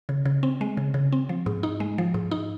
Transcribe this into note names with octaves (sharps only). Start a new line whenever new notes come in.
C#3
C#3
C4
G#3
C#3
C#3
C4
F3
G#2
D#4
G#3
F3
G#2
D#4